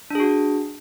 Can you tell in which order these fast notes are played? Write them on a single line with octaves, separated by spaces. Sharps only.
D4 G#4 F#4